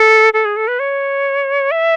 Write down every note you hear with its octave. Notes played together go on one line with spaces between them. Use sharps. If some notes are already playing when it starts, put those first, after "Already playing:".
Already playing: A4
A4
G#4
A4
B4
C#5
E5